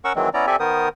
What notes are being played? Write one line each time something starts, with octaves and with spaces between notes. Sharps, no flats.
C#4 A#4 F#5 C#6 E6
D#3 E3 F#3 G#3 C4
B3 C#4 E4 D5 A#5
C4 G4 A4 D5 E5 G#5
D#3 B3 A#4 C5 D#6